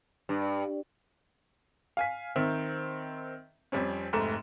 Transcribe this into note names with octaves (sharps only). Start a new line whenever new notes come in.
G2
F5 G#5 B6
D#3 C4 E5
F2 G3 C4 C#4
F1 G#2 A3 E7